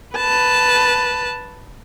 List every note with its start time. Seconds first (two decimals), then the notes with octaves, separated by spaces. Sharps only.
0.16 B4 A5